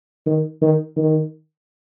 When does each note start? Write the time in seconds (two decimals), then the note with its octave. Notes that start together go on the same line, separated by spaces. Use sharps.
0.27 D#3
0.61 D#3
0.96 D#3